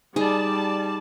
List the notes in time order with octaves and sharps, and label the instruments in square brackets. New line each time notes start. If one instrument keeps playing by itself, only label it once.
[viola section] G3 D5 A5 [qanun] D#4 G#4